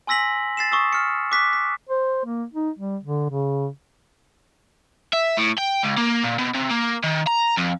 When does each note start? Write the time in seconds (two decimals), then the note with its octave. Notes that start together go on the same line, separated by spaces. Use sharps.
0.07 G#5 C6 E6 A#6 B6 F#7
0.57 A6 C7 E7
0.71 C#6 D#6 E6
0.93 F6 C#7
1.32 D6 F#6 B6
1.53 B6
1.89 C5
2.25 A#3
2.54 D#4
2.79 G3
3.03 D3
3.30 C#3
5.13 E5
5.38 A2
5.58 G5
5.83 C#2
5.97 A#3
6.24 A#2
6.39 B2
6.55 C3
6.71 A#3
7.04 D#3
7.27 A#5
7.57 F2